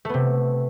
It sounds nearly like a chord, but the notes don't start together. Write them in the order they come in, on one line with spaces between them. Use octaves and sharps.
A3 B3 C3